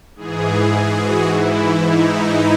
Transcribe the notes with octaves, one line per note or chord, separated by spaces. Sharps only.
G#2 E3 G#4
F#4
G#2 E3 E4
D#4
D#4